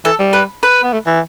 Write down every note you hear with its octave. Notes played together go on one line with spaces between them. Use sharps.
E3 A4
G3
B4
B4
B3
A3
E3